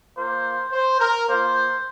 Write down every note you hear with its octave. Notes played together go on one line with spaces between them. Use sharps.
A#3 F4 C5
C5
A#4
A#3 F4 C5